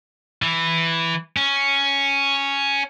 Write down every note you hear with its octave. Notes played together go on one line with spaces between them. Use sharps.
E3
C#4